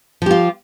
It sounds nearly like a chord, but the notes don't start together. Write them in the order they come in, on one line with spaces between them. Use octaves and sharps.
F3 G4 F4